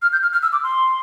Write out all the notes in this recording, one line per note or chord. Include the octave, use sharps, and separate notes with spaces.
F6
G6
F6
F6
E6
D6
C6